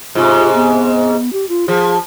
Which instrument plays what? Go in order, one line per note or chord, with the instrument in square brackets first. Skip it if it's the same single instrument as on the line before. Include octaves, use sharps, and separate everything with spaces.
[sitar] G#2 C3 [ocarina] F4
[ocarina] B3
G4
F4
[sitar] F3 [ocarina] G#4